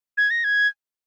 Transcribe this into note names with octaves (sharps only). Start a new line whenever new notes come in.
G#6
A#6
G#6